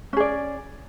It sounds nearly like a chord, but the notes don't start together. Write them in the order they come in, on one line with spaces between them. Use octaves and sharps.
C#4 G#4 D5